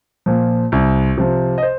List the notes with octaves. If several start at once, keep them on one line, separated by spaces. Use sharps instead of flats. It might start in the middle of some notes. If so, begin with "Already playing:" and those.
A#2 F3
C2
C3 F3
D#5
C5